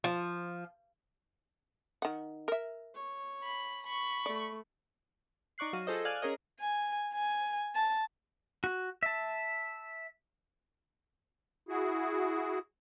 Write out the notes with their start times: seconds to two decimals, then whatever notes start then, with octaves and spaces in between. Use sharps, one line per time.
0.04 F3
2.02 D#3 F#5
2.48 A#4 E5
2.94 C#5
3.44 B5
3.86 B5 C#6
4.26 A3 D5
5.58 D#4 D5 C#6 F#6 C7
5.73 F#3 F#4 F5 D#7
5.87 F4 G#4 A4 C5 D#5
6.05 D5 F5 G#5 F6 F#6 G#6
6.22 C#4 G#4 A#4 C#5 D#5
6.60 G#5
7.14 G#5
7.75 A5
8.64 F#4
9.03 E5 A5
11.69 E4 F#4 G#4